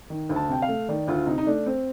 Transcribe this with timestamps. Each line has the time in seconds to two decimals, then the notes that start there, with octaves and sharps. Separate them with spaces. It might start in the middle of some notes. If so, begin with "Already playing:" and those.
0.10 D#3
0.29 D2
0.36 A5
0.49 C3 G5
0.62 F5
0.69 A3
0.89 D#3 D5
1.08 D2 F4
1.27 C3 D#4
1.38 D#4
1.46 A3 D4
1.66 C4